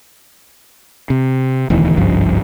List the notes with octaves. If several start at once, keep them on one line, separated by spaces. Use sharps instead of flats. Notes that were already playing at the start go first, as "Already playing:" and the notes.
C3
E1 D2 D#3 E3
G#1 C#2 G2 F3